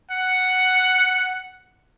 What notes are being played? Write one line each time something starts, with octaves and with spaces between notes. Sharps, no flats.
F#5